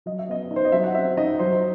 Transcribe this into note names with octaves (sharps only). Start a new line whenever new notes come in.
F#3 D#5
E5
B3 D#5
D#4
C5
D#5
F#3 E5
F#5
C4 E5
D#4 D#5
F#3 C5